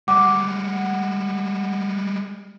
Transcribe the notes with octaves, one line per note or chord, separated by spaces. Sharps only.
G3 G#3 F#5 D6